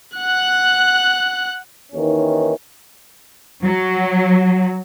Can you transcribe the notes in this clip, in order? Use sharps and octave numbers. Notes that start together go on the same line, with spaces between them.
F#5 F#6
D#2 D#3 E3 C#4
F#3